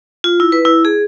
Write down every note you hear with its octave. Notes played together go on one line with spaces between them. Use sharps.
F4
E4
B4
E4
G#4